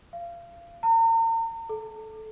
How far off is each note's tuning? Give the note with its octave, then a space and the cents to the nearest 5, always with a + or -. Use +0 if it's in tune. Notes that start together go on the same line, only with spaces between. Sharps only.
F5 -30
A#5 -40
A4 -15